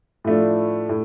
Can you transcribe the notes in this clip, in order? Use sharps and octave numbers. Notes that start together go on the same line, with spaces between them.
A2 F3 A3 D4
A2